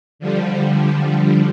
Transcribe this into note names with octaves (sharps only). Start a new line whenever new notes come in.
D3 F3 G3